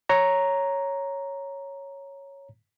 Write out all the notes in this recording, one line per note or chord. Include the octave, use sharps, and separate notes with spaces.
C#5 A#5